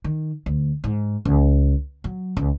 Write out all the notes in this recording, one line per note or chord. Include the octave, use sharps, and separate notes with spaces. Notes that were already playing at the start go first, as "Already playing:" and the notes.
D#3
D2
G#2
C#2
F#3
C#2